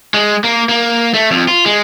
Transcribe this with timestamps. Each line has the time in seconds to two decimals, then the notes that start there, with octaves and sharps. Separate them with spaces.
0.14 G#3
0.44 A#3
0.69 A#3
1.14 A3
1.31 F2
1.48 F4
1.66 G#3